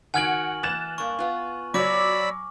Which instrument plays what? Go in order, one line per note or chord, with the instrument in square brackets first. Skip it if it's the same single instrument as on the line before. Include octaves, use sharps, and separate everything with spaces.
[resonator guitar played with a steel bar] D#3 F#4 [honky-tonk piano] F#5 G#6 D7 [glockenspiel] G#5 F6 F#7
[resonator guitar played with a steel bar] E3 [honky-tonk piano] F#6 A6 E7
[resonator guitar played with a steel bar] G2 A#3 [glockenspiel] C#6
[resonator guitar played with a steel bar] B3 F4
[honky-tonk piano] F#3 C#5 [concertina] D5 B5 E6 [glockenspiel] D6